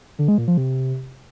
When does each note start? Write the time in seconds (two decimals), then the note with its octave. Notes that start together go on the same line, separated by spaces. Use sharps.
0.19 D3
0.28 G#3
0.38 A#2
0.48 F3
0.57 C3